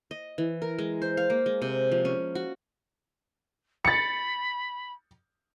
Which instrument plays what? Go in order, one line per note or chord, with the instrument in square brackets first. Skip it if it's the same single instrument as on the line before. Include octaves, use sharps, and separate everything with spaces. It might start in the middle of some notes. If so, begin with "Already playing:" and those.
[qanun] D#5
E3
A#4
G#3
C5
F5
A#3
G#3
C3
F3
C#4
F#4
[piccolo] B5 [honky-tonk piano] A6 C#7